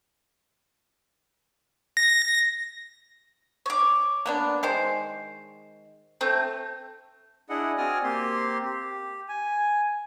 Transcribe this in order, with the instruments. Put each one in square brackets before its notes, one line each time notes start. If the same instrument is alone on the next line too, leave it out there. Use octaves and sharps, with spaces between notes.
[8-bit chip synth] A#6
[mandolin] C#5 D6
[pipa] A#3 B3 D4
D#3 G#3 C5
[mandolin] A3 C4
[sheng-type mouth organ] D4 E4 G#4 D#5 F#5
C4 F#4 D5 G#5 D#6 F6
A#3 C4 G4 C6
G4
G#5